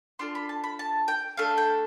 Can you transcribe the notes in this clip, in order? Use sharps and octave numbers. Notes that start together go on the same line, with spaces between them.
D4 F4 A4 C6
B5
A5
B5
A5
G5
A3 D4 A4 F5
G5